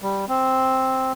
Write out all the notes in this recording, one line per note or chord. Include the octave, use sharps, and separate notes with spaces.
G3
C4